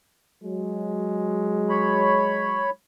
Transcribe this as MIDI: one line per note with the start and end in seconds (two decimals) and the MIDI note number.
0.42 2.73 54
0.42 2.73 56
1.69 2.70 73
1.69 2.70 83